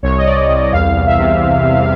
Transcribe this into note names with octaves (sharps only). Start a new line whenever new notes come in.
C2 C#5
D#5
C2 D5
C2
E2 F5
E2
E5
C3